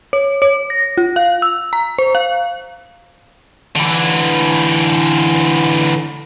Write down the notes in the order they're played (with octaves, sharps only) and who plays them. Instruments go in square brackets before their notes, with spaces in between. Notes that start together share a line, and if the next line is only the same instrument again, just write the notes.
[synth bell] C#5
C#5
A#6
F4
F5
E6
A#5
C5
F5
[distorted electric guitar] D3 E3